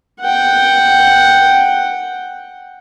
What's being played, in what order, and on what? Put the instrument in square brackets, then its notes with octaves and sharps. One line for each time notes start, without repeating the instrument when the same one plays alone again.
[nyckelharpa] F#5 G5